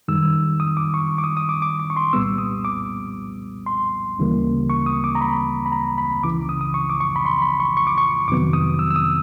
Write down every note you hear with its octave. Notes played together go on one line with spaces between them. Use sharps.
F#2 D#3 G3 E6
D#6
D6
C#6
D6
D#6
D#6
D6
D6
D6
C#6
C6
C2 A#2 G3 B3 E6
D#6
D6
C6
D2 C#3 E3 G3 A#3
C#6
D#6
D6
A#5
B5
B5
A#5
B5
C#2 C#3 E3 D6
D#6
D#6
C#6
D6
C#6
B5
C6
B5
C#6
C#6
D6
C#6
F2 C3 D#3 F#3 B3 D6
D#6
E6
E6
D#6